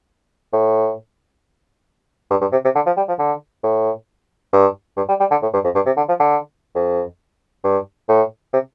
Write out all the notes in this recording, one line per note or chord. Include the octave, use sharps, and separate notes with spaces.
A2
G2
G2
C3
C3
D3
F3
G3
F3
D3
A2
G2
G2
G3
G3
D3
A2
G2
F2
G2
C3
D3
F3
D3
F2
G2
A2
C3